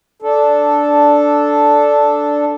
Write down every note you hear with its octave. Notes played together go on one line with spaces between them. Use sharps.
D4 A4